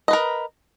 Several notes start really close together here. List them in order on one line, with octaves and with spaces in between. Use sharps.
D#5 B4 A#4